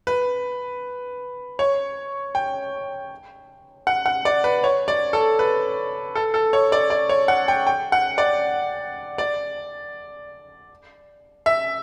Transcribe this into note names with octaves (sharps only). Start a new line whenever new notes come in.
B4
C#5
G5
F#5
F#5
D5
B4
C#5
D5
A4
B4
A4
A4
C#5
D5
D5
C#5
F#5
G5
G5
F#5
D5
D5
E5